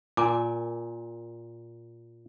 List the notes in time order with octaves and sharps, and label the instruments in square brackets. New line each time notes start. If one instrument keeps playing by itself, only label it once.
[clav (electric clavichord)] A#2 [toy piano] A#4 G#5 D6